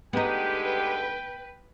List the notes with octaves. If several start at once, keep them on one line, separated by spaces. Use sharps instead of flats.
D3 G#3 B3 D#4 G4 B4 G5